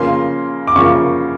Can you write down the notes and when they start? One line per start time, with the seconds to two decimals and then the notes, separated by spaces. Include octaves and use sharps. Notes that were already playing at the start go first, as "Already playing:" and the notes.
Already playing: C#3 F3 A#3 C6
0.67 D6
0.76 C#3 F3 A#3 C#6